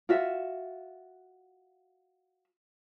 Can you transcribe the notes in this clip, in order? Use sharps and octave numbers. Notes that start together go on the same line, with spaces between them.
F4 F#4 E5